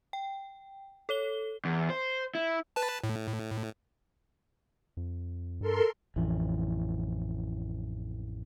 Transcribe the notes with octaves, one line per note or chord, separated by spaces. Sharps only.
G5
A4 C#5 G7
E2
C5
E4
B4 A5
A2
F2
G2 A4 A#4 C6
A1 F2 E3